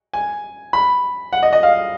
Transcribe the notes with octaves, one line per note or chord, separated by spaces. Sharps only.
G#5
B5
F#5
D#5
D#5
F5